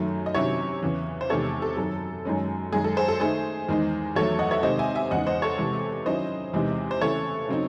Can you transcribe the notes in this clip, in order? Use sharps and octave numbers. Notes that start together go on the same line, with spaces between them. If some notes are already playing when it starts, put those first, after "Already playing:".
Already playing: F#2 D#3 F#3 A3
D#5
C3 D#3 F#3 C#4 E4 C#5 E5
E2 C#3 E3
C5
E2 C3 D#3 G#3 C4 A4 C#5
A4
F#2 D#3 F#3 A4
F#2 D#3 G#3 C#4
F#2 D#3 G#3 G#4
A4
G#4 C5
A4
D#3 A3 D#4 G#4 C5
E2 D#3 G#3 D#4
E2 D#3 F#3 A3 A4 C#5
D#5 F#5
C#5 E5
C3 D#3 G#3 C4 D#4 C5 D#5
E5 G#5
E5 G#5
E2 C#3 G#3 D#4 D#5 F#5
C5 D#5
A4 C#5
C3 E3 G#3
D#3 F#3 C#4 E4 C5 D#5
E2 C3 E3 G#3 D#4
C5
C#3 E3 A3 C#4 E4 A4 C#5
C#3 F#3 C4 D#4